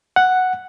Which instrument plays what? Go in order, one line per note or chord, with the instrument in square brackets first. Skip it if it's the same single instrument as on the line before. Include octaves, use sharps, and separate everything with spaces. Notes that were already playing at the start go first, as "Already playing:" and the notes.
[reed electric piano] F#5